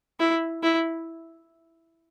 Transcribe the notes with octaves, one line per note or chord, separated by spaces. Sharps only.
E4
E4